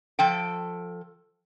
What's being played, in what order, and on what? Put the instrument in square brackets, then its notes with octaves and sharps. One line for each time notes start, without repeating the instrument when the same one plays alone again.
[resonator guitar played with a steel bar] F3 A4 G5